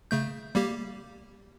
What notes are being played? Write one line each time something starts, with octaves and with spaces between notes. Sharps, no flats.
C#3 A3 G6
G3 A#3 G4